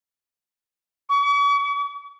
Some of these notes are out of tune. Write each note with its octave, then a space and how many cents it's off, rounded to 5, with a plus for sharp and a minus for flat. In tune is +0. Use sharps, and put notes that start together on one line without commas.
C#6 +45